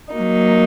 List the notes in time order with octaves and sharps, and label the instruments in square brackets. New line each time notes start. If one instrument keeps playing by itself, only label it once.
[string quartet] F#3 A#3 D#4